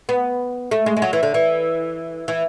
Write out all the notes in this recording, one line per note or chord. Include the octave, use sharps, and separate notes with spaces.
B3
A3
G#3
G#3
F#3
E3
D3
E3
E3